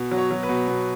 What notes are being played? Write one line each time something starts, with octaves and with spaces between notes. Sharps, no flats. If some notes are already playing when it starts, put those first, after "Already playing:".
Already playing: B2
F#3
C#5
F#3
B4
B2
B2